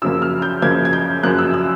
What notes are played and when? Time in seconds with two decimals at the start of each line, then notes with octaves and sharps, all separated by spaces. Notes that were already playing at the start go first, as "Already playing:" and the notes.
0.02 F#2 C#3 F3 A#3 E6
0.22 F6
0.42 G6
0.62 F#2 C#3 F3 A#3 G#6
0.85 G#6
0.93 G6
1.23 F#2 C#3 F3 A#3 F#6
1.38 E6
1.54 E6